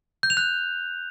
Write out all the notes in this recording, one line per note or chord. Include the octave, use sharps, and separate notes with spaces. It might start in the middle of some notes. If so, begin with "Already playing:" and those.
G6
F7
F#6